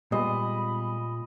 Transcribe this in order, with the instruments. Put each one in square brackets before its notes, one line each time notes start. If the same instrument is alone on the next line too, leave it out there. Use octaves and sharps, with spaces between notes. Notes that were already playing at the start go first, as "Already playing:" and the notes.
[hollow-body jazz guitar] A#2 [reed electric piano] G3 G#3 B3 [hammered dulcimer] D#5 [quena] B5